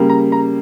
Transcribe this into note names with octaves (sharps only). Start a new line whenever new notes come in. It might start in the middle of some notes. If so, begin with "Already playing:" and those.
Already playing: C#3 G3 A#3
A#5
A#5